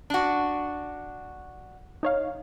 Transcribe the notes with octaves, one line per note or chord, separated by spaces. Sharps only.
D4 F#4
D#4 C#5 F5